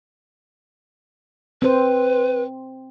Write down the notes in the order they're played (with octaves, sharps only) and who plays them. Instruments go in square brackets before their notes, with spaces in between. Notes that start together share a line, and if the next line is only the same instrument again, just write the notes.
[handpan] C4 C5 [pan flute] B4